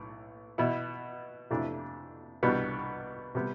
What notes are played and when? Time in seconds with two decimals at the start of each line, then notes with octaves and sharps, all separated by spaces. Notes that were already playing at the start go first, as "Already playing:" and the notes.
Already playing: B1 A2
0.58 B2 B3 E4
1.50 F2 C3 E3 A3 D4
2.43 C2 B2 G3 B3 D4
3.35 C3 G3 B3